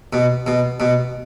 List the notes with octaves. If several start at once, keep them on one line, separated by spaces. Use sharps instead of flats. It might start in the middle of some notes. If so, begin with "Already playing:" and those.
B2
B2
B2